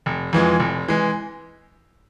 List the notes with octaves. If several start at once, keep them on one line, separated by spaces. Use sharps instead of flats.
F1
F2 E3 G#3
F1
E3 G#3